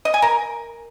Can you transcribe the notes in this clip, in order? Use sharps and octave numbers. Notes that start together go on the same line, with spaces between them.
D#5
G#5
A#4